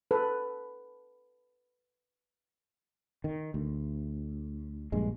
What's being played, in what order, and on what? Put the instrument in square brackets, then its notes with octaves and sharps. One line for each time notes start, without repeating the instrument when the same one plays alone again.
[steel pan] A4 B4
[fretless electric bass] D#3
D2
A#1 G2 G#3